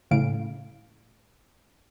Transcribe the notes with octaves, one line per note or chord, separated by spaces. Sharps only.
A2 C#3 F5 D7